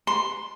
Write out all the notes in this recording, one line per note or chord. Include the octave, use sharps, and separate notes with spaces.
C6